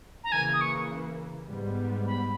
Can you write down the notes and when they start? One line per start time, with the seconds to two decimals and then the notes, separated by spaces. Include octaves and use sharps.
0.24 A#5
0.32 C#3 E3 A#3 G#5
0.53 D#6
0.61 C#6
1.48 G#2 G3 B3
2.06 B5